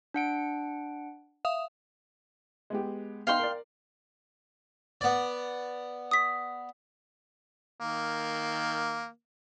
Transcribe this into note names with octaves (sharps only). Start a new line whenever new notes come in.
D4 F#5 D7
E5 F5 D#6
G#3 B3 G4
B3 D#4 F5 G5 C6
A#4 D5
B3 D5
D#6 B6
D#3 A#3